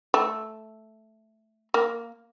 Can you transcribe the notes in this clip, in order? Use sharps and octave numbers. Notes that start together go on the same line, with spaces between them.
A3
A#3